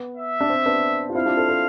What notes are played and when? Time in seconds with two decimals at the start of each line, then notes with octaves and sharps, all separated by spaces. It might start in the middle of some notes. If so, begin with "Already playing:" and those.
Already playing: B3
0.17 E5
0.41 D4
0.50 C4
0.66 B3 D4
1.10 F4
1.15 C4 E4 F5
1.26 D4 F4
1.37 A4 C5
1.48 A4 C5